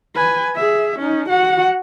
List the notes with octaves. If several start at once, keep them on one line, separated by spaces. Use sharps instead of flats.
B4 G#5
G#4 E5
C#4 D#4
F#4 F#5